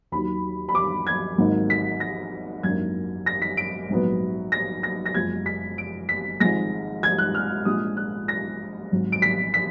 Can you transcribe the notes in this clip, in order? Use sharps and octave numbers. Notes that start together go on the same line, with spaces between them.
D#2 D#3 F#3 B5
B5
D6
G#6
G#1 G#2 F#3 A#3 D#4
B6
A#6
G#1 F#2 D#3 A#3 D4 G#6
A#6
B6
D7
A#1 G#2 F#3 B3
A#6
A#6
A#6
F#1 F#2 F3 G#3 G#6
B6
D7
B6
G#1 G#2 F3 G#3 A#6
G#6
F#6
F6
A#1 A#2 G#3 D4 D#6
F#6
A#6
G#1 G#2 F#3
D7
B6
B6